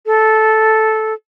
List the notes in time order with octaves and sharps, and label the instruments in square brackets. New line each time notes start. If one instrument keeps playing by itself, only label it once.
[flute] A4